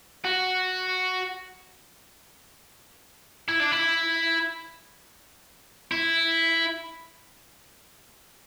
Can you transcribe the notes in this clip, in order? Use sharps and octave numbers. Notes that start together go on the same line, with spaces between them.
F#4
E4
D4
E4
E4